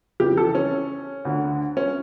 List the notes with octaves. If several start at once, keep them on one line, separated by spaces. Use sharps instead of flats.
F2 C#3 E3 G4
A4
C#4
D2 D3
C#4